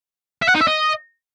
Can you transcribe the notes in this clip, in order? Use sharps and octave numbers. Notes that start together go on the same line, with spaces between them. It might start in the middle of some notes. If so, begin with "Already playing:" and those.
E5
F#5
D#4
E5
D#5